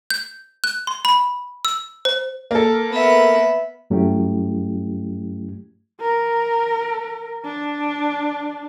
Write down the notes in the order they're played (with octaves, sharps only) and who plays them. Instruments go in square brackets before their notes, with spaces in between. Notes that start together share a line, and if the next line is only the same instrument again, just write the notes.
[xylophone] G6
F#6
C6
B5
E6
C5
[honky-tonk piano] A#3 A4
[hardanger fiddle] B3 E5
[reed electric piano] G2 F#3 A3 C#4 E4 G4
[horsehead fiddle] A#4
D4